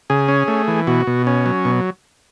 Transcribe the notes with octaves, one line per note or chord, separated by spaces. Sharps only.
C#3 G#4
C#4
A3
E3
B2 F#4
B2
C#4
F#3
B2